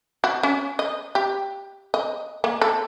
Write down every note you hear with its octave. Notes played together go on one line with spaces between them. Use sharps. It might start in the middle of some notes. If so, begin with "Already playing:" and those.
F#4
C#4
D#5
G4
D#5
A#3
A4